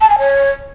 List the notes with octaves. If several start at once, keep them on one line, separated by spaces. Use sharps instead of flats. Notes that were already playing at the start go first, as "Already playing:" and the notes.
A5
G#5
C#5